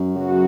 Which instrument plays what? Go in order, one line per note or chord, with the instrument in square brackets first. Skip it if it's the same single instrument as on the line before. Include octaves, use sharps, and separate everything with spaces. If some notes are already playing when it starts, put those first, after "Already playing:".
Already playing: [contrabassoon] F#2
[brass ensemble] C#3 F#3 B3 F#4